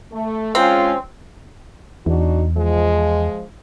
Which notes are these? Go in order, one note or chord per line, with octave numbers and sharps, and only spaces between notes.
A3
G#3 C4 C#4 F4
E2 D4 D#4 F#4
F3 G#3